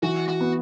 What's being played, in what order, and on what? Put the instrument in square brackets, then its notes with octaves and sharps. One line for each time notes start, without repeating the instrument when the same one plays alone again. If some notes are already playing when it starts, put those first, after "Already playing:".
[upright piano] E3 [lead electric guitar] F#4
[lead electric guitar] F#4
[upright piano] B3